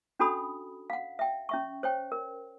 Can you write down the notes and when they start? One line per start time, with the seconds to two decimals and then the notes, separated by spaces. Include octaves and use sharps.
0.19 C#4 D4 F#4 A4 B5 D#6
0.90 F5 F#5
1.19 E5 G5
1.49 C#4 E5 C#6
1.83 C5 C#5 G5
2.12 A#4